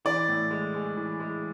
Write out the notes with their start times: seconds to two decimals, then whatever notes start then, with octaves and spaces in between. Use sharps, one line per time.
0.05 E3 D5
0.29 A2
0.51 G#3
0.75 G#3
0.97 E3
1.20 G#3